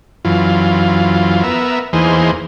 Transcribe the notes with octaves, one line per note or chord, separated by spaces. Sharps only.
F#2 E3 F4
B3 A#4 E5
E2 E3 A#3 D#4 G#4 C5